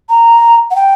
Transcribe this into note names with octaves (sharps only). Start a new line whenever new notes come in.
A#5
F#5
G5